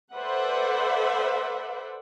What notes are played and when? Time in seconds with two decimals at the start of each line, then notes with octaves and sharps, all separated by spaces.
0.14 A4 B4 C5 D5 E5 F#5